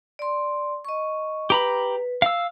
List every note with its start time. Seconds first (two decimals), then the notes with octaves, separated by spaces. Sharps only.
0.19 D5 C6
0.85 D#5 C#6
1.50 G4 B4 A#5 B5
2.22 F5 E6